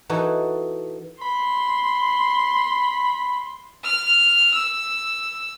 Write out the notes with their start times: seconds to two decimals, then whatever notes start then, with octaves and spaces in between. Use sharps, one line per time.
0.09 E3 D#4 F#4 A4
1.22 B5 C6
3.84 F6
4.54 E6